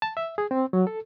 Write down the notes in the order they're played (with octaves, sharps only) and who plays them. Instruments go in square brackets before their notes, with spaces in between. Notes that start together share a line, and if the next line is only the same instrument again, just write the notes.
[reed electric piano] A5
E5
G#4
C4
F#3
A4